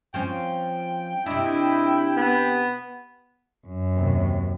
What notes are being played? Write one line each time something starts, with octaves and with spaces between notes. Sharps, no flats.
F3 C4 C#4 G5
C3 D4 E4 D#5
B3
F#2
D#2 C3